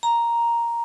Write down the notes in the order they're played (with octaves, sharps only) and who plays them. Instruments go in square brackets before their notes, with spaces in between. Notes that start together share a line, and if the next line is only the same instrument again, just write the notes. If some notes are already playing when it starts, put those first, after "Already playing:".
[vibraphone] A#5